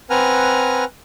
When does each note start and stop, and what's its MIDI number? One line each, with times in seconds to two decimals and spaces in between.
0.10 0.84 60
0.10 0.84 71
0.10 0.84 78
0.10 0.84 80
0.10 0.84 82
0.10 0.84 89